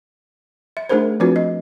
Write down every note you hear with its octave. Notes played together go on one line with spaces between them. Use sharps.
E5
A3 D4 D#4 G#4 A#4 C5
F3 C4 D4 F4 F#4 B4
D#5